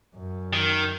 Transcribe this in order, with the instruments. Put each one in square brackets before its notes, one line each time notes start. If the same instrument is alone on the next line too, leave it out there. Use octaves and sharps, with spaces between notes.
[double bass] F#2
[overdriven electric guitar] D#3